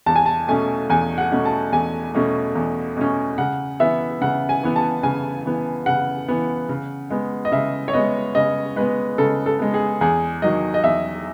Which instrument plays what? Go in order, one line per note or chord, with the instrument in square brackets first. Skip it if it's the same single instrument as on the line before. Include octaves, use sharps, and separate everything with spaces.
[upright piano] E2 A5
G#5
A5
B2 A3 C#4 G#5
E2 G#5
F#5
B2 A3 C#4
A5
E2 G#5
B2 A3 C#4
E2
B2 A3 C#4
C#3 F#5
E3 B3 E5
C#3 F#5
G#5
E3 B3
A5
C#3 G#5
E3 B3
C#3 F#5
E3 B3
C#3
G#3 B3
D#5
C#3 E5
C#5
G#3 B3 D#5
C#3 D#5
G#3 B3 B4
C#3 A4
A4
G#3 B3
G#4
E2 G#4
D#3 F#3 D#5
D#5
E2 E5